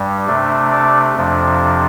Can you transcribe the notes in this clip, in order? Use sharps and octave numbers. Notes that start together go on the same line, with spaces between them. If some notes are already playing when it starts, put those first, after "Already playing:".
Already playing: G2 G3
C3 A3 D4
D5
F2 C3 F3 D4